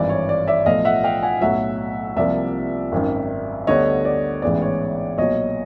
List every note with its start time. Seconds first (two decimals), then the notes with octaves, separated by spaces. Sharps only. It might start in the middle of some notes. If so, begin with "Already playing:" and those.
Already playing: G#1 G2 E3 D5
0.09 C#5
0.29 D5
0.47 D5 E5
0.66 B1 A2 F3 A3 D#5 F5
0.85 E5 F#5
1.04 F5 G5
1.23 F#5 G#5
1.41 B1 A2 F#3 E5 F#5
2.16 C2 C3 F3 A#3 D5 E5
2.92 G#1 F#2 D#3
3.67 D2 D3 G3 B3 C#5 D#5
4.05 D5
4.42 A1 G#2 E3 G#3 B3 D5
4.62 C#5
5.18 B1 A#2 F#3 C#5 D#5